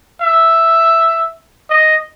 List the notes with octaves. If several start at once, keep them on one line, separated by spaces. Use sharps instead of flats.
E5
D#5